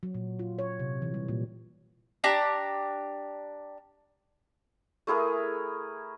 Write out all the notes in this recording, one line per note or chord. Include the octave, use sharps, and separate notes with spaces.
F#3
A#2
F4
C#5
C3
E3
G3
A#2
D4 G4 A#5
A3 E4 G#4 A#4